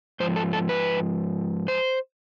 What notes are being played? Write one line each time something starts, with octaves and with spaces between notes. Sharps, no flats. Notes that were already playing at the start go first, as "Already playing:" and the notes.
G#2 F3 C5
A4
A4
B4
C5